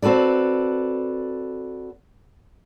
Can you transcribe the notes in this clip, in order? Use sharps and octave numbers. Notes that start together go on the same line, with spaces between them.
C4 F#4 A4 B4 D5